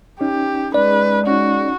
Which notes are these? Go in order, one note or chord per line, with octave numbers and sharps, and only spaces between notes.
C#4 D#4 G4
G#3 B4 D5
C#4 D#4 F#4